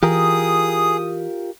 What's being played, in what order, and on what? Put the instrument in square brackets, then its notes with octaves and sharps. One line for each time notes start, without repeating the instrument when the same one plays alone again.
[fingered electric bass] E3 [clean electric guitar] F4 G4 A#4 [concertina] G#4 [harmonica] D#6